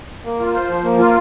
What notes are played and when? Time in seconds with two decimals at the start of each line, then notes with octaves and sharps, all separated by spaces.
0.25 A#3
0.39 F4
0.55 C5
0.69 F3
0.84 A#3
0.99 F4